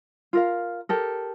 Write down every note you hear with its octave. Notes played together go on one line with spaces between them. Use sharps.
F4 A#4 F5
G4 A4 A#4